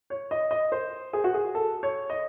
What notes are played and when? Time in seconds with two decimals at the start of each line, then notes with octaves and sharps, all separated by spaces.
0.10 C#5
0.31 D#5
0.51 D#5
0.72 C5
1.13 G#4
1.24 F#4
1.34 G#4
1.55 A4
1.83 C#5
2.10 D#5